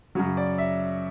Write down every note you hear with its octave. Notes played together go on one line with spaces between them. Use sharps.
F#2 C#3 F#3
D5
E5